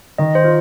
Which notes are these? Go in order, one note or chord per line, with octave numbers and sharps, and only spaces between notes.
D#3 D#5
C5
F4